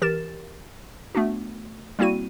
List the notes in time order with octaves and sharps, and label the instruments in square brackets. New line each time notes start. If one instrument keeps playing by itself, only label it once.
[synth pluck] E3 G4 A#4 A6 E7
A3 B3 D4 F#4
G3 A#3 C4 E4 F#4 D#7